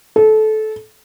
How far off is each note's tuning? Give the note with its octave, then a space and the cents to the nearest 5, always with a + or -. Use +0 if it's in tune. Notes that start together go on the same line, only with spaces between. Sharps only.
A4 -20